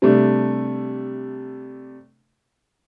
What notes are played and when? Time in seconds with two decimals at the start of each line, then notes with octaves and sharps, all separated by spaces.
0.02 C3 G3 A3 D4